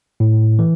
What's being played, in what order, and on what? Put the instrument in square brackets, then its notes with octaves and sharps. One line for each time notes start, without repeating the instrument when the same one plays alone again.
[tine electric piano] A2
E3